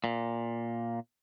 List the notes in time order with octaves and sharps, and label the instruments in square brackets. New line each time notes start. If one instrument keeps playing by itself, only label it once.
[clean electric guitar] A#2